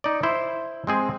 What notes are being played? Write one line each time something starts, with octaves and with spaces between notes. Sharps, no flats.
D#4 D5
E4 C5
G#3 C4 G#4